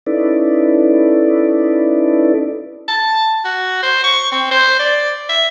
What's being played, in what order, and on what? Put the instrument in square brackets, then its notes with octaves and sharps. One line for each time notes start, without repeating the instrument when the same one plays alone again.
[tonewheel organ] C#4 D#4 E4 A4 B4 D5
[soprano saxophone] A5
F#4
C5
C#6
C4
C5
D5
E5